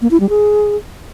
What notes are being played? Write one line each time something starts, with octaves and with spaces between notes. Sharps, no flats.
A#3
E4
G3
G#4